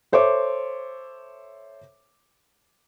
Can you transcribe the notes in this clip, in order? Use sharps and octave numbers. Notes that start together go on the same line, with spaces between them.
A4 C5 C#5 E5 D6